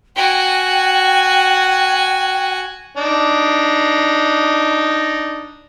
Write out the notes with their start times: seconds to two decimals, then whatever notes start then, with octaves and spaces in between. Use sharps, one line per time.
0.16 F#4 G5 G#5
2.97 D4 D#4